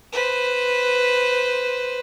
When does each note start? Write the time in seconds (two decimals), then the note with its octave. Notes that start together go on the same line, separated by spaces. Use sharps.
0.13 B4 C5